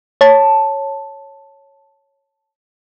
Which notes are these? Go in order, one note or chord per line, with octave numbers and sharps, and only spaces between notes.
C#5 A5